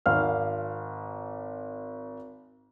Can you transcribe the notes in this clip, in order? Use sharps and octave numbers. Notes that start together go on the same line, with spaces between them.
G#1 F5 F6